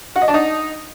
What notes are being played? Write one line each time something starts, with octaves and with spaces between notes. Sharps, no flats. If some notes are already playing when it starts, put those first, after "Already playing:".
F#4
D#5
D4
D#4